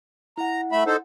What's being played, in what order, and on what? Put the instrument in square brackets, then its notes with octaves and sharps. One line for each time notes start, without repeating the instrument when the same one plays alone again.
[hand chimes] E4 F#5 [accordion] A#5
[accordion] A3 E5 B5
D#4 A4 C5